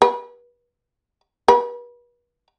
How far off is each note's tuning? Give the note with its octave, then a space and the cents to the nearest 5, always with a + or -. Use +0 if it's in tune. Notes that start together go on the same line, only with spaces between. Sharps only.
B4 -35
B4 -40